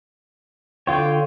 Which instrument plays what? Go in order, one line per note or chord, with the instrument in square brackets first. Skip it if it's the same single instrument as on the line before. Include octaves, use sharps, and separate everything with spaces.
[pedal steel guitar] D3 F4 C#5 [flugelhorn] G5